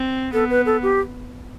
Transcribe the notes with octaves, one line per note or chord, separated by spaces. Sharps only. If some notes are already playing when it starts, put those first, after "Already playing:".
Already playing: C4
B3 A4
B4
A4
G4